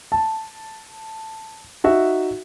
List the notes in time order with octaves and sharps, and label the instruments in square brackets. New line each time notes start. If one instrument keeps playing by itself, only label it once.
[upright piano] A5
D#4 F#4 E5